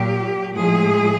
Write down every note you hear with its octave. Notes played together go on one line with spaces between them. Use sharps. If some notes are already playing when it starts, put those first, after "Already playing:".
Already playing: A#2 F#3 G4
A2 F3 G#3 G#4